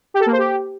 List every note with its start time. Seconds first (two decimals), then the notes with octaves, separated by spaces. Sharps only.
0.14 G4
0.20 A4
0.26 A#3
0.32 C5
0.38 G4